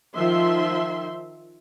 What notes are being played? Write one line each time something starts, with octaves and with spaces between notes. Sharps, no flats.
D#3 F3 E5 C6